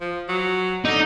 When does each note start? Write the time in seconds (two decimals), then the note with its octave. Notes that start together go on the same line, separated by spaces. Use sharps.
0.01 F3
0.29 F#3
0.85 D3 D#4